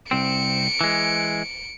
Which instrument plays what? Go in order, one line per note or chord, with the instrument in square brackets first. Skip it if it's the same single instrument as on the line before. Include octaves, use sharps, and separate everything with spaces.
[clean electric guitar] C2 C4 [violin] C#7 D7
[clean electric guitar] E3 G#3